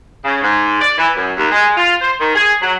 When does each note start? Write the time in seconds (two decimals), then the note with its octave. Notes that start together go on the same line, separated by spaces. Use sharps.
0.25 C#3
0.43 G#2
0.81 D5
0.98 E3
1.16 F#2
1.37 D#2
1.51 G#3
1.76 F4
2.01 C5
2.19 D#3
2.35 G#4
2.62 F#3